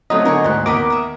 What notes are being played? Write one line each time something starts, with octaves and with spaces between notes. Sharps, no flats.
F#3 A3 C4 D#4 F4 D#5
D3 A#4 G#5 C#6
D2 G#2 C5 F#5
D#2 A#3 B3 A#4 D#5 B5 D6
E5 D#6